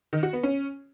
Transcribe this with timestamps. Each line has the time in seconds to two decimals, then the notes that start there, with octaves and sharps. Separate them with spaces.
0.13 D#3
0.23 F#4
0.33 B3
0.43 C#4